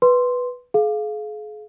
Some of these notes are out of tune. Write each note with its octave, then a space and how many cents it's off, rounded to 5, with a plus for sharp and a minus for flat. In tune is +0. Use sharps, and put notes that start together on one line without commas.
B4 +0 C6 +0
G#4 +40 F5 +0